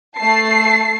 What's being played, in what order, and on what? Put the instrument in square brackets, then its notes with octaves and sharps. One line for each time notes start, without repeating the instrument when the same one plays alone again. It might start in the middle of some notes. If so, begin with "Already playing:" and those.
[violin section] A3 A5 C7